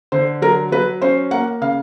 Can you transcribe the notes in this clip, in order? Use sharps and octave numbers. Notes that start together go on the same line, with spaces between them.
D3 C5
F#3 A#4
F#3 B4
C#4 C5
A#3 F#5
C#3 F5